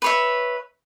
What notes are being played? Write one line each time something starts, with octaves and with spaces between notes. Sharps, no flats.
B4 C#5 E5